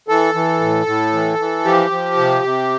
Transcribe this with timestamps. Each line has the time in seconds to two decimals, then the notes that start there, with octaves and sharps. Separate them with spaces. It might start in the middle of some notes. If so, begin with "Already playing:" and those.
0.08 E3 A4
0.35 E3
0.61 A2
0.86 A2
1.13 E3
1.39 E3
1.65 F3 G4
1.91 F3
2.17 C3
2.43 C3